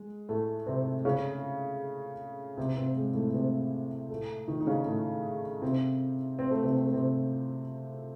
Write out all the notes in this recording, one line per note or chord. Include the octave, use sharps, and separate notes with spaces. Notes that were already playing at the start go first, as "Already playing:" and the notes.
Already playing: G#3
A2 A3
C3 C4
C#3 C#4
C3 C4
C3 C4
G#3
A2 A3
C3 C4
A2 A3
D#3 D#4
D#4
C#3 C#4
A2 A3
C3 C4
C4
A3
C3 C4
C4
A3
C3 C4